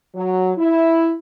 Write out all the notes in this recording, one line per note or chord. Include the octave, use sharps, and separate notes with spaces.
F#3
E4